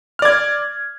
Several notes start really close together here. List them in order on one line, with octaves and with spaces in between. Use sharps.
F6 D5 G#6